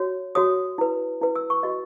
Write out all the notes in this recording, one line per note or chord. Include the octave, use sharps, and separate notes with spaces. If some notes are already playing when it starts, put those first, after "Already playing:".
Already playing: F#4 C#5
F#4 C#5 D#6
E4 B4
E4 B4
E6
C#6
F#4 B4 D#5